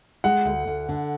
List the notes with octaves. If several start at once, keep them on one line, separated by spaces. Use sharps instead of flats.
G#3 F#5
D2
D2
D3